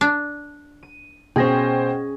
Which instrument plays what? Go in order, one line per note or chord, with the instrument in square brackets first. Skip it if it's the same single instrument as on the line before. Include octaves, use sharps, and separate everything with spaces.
[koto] D4
[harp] D#7
[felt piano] B2 A#6 [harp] C#4 G#4 [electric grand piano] C5 G5